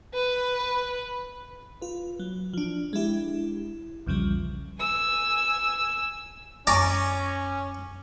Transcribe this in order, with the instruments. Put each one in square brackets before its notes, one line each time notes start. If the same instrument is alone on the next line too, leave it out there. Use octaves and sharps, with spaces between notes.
[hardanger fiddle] B4
[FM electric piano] F4 B4
F#3
F3 D4
G#3 D4 E4 G4
B1 E2 C#3 F3 G3
[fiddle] G#5 E6
[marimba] F#2 [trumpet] C#4 [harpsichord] D5 A#5 [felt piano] G#5 C#6 D6